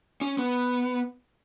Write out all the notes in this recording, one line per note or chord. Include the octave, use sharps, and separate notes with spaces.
C#4
B3